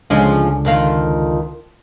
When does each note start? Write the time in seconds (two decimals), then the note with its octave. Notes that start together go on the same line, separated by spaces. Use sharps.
0.10 C#2 D3 F3 G#3 C#4 D4
0.65 F2 D#3 F4